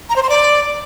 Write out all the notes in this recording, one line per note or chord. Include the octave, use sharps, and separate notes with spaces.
A#5
C5
C6
D5